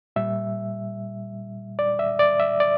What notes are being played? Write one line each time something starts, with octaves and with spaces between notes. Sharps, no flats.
A#2 G3 E5
D5
E5
D5
E5
D5